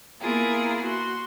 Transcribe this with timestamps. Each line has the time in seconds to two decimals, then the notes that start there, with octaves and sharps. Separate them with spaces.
0.20 A#3 B3 E4 F4 G#4 A#4
0.82 F#4 C6